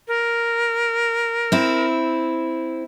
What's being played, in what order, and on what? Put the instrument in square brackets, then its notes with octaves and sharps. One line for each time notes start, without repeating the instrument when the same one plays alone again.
[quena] A#4
[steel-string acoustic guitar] C4 E4